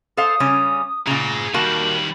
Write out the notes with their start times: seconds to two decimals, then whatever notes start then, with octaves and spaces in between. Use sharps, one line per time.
0.17 A4 C5 F5 D#6
0.40 C#3 G3 C#4
1.07 A#2 C#3 G#4 A#5
1.54 D#3 G3 A#3 F#4 A5 F#7